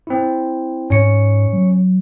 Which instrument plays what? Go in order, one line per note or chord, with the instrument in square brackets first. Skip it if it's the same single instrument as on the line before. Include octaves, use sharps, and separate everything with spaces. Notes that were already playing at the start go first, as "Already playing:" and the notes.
[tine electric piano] C4 E4
[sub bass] G#2 [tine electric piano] C#4 C#5 C#7
[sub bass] F#3